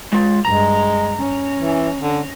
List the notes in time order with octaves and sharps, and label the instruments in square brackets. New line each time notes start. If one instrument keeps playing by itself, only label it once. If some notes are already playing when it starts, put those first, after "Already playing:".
[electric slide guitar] G#3 F4
[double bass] G2 [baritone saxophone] G#3 [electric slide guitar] A#5
[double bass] C#4
[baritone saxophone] E3
D3